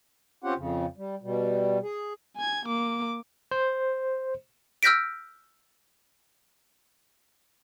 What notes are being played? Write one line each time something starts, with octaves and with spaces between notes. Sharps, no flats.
C4 C#4 F4 G4 F#5
F2 C#3
G3
B2 G3
G#4
G#5 G#6
A#3 D6
C5
E6 F6 G6 A#6 B6 D7